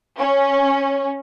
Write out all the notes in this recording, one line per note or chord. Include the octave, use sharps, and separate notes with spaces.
C#4